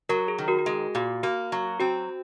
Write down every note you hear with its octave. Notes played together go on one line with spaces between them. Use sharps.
F#3 F#4 A#4
G#4
D#3
F#4 A#4
F#4
G#3 G#4
A#2 F#4
A#3 F#4
F#3
C4 F#4